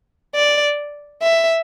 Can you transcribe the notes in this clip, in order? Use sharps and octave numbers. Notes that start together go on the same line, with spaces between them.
D5
E5